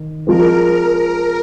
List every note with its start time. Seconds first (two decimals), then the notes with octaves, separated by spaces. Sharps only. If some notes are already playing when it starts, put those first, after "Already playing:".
Already playing: D#3
0.27 F3 G#3 C4 A#4
0.60 A#4
0.94 A#4